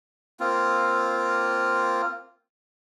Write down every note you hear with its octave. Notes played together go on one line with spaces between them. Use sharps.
A#3 C4 F4